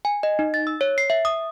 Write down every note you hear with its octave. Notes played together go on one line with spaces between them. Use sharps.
G#5
D#5
D#4
A6
E6
C#5
C7
E5
D#6